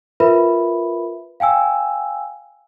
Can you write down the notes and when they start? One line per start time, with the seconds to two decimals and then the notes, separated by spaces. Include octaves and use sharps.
0.20 F4 A#4 B4 E5 B5
1.40 F5 G5 G#5 E6